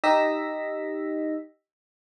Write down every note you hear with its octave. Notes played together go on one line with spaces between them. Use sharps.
D#4 G4 D#5 E6 A#6 B6